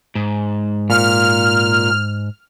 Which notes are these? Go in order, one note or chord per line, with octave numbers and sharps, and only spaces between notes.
G#2
A#2 F6